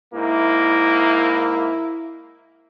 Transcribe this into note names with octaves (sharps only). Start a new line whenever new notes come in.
G#2 A#3 E4